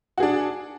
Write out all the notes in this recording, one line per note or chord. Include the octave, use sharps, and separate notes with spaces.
D4 F#4 G#4